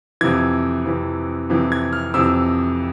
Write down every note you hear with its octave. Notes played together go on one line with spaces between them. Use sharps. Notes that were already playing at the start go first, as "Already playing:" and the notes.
F2 C3 E3 G#6
F2 C3 E3
F2 C3 E3
G#6
F6
F2 C3 E3 E6